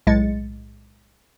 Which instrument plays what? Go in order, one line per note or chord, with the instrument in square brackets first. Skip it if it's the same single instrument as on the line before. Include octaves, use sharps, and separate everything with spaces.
[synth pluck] B1 A2 G#3 A6 C#7